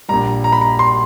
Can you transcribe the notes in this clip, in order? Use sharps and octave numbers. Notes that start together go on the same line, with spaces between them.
A#1 A#2 G3 A#5
A#5
B5
A#5
C6